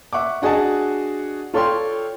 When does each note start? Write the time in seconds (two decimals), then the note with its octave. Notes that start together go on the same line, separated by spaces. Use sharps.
0.13 E5 F#5 C#6 D6
0.42 D4 F#4 G#4 D#5 F#5 A5
1.54 F4 A4 C#5 D5 G5 C6